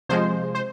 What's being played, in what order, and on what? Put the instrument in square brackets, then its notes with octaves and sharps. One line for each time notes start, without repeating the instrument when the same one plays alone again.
[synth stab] C3 F3 G#3 C5
C5